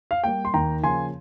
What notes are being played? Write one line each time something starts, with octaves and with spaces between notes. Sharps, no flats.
F5
G3 A#3 G5
C6
D#2 G5 A#5
C#3 F3 A#3 G#5 C6